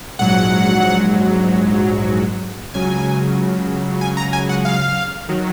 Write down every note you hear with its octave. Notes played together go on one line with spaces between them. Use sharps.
A#1 G#2 F#3 F#5
C#2 C#3 F#3 G#5
G#5
A#5
G#5
F#5
F5
D#3 F#3